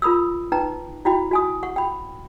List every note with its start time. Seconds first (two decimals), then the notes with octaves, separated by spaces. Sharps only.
0.02 F4 A#4 B5 D#6 E6
0.52 D#4 B4 G5 A#5
1.05 E4 F#4 G5 B5
1.31 F#4 G#5 D#6
1.63 F#5 C#6
1.76 G5 B5